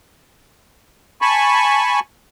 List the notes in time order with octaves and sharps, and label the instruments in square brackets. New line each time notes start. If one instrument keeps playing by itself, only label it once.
[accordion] G#5 A5 B5 C#6